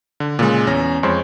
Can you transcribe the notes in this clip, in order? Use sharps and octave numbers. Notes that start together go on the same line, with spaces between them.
D3
A#2 C#3 G#3
E2 C#4 A#6
F2 G#3 C5 C#5